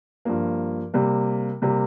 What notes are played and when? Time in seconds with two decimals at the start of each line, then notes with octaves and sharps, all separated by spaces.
0.25 G2 F3 A#3
0.94 C3 G3 A#3
1.62 C3 G3 A#3